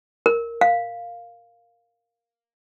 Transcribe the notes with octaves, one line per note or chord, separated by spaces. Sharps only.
A#4
F5